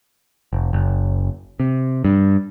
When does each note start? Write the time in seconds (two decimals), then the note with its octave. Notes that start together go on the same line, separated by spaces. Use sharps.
0.53 F1
0.73 F#1
1.60 C3
2.05 G2